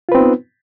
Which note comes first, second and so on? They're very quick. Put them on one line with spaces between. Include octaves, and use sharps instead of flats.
F4 B4 C4 D#4 B3